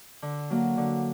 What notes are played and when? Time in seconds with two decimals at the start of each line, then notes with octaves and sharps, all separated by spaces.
0.22 D3
0.50 F#3 A#3
0.77 D3